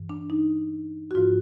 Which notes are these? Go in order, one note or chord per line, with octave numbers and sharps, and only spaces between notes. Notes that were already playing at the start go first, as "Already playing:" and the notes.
Already playing: G2 E3
D4
D#4
F#4
G#2 F3 F4